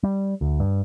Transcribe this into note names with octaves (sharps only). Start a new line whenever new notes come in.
G3
D2
G2